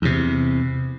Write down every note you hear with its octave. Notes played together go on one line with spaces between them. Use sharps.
E2 C3